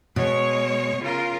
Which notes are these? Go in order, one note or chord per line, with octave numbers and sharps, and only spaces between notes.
B2 G#3 C#5
C#3 F4 A#4